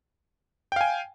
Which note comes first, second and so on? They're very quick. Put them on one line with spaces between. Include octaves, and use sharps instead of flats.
G5 F5 G#5